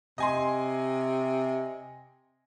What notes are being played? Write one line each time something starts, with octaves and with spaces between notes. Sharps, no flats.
C3 D#5 G#5 C6